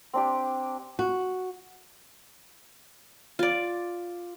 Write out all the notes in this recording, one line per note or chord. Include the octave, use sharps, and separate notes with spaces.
C4 D4 G4
F#4
F4 D5